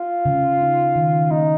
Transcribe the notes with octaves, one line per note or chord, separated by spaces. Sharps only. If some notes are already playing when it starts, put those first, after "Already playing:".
Already playing: F4
C#3
D#4
D#3
A#3 D#4